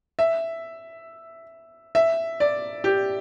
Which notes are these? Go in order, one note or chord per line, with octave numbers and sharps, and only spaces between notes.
E5
E5
D5
G4